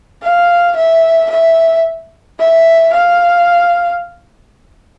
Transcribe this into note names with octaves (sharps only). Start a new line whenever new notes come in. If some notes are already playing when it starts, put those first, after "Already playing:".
F5
E5
E5
E5
F5